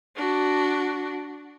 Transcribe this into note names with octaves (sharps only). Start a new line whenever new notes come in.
D4 F#4